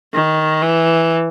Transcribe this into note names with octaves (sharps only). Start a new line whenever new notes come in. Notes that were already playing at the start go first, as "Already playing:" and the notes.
D#3
E3